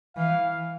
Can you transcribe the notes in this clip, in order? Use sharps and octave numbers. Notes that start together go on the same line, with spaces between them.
E3 F5